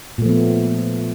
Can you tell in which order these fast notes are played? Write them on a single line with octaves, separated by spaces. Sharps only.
A#2 A3 F3 B3